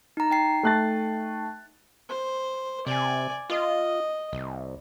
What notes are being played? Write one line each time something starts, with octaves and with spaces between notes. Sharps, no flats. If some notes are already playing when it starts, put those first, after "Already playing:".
D#4 A#5
D#4 G5 C7
A3 F#6 A6
C5
C3 D5 G#5
F4 D#5
C2